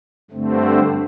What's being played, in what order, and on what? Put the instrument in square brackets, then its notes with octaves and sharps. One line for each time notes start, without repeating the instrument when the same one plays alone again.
[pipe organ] G2 D3 A3 C4